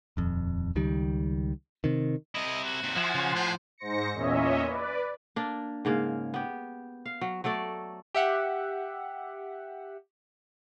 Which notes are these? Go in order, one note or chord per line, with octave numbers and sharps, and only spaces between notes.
D#1 F2
C#2 D#3 G3
C3 D#3
C3 E4 D#5
F#4
D#2 C3
F3 E4 E5 F#5 G#5 C6
C#3
A2 C5
G#2 C5 A#6 C#7
E2 A#2 C#4 C#5 D#5 E5
B4 D5
A#3 D4
G#2 C#3 A#3
B3 G4
F5
F#3
F#3 A3 A4 D5
G4 E5 F#5